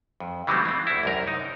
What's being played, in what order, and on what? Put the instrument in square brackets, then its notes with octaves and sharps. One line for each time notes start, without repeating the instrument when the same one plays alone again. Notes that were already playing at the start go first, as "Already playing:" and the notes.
[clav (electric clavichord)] F2
C#3 E3 F#3 G3 A3 C4
E3 C4
D2 E4
C2 F#2 A#4
D#4